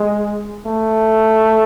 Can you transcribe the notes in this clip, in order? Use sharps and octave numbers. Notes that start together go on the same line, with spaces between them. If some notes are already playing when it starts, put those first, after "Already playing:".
Already playing: G#3
A3